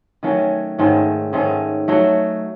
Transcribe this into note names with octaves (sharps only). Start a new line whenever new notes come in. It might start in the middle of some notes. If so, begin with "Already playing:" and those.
D#3 F#3 A3 C#4
G#2 D#3 A3 C#4
G#2 D#3 A3 C#4
F#3 A3 D#4 F#4